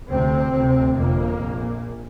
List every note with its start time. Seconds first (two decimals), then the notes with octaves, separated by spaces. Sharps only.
0.10 D2 C3 C4
0.53 D2 C3
0.97 G1 F2 C3 A#3
1.41 A#1 A#2